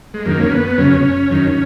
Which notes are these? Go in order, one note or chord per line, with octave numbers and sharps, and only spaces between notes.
G#3
F#2 D#3 A#3
C#4
B3
F#2 C#3 C#4
F#2 D#3